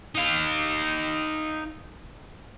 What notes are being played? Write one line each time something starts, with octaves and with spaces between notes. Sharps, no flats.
D#4 F5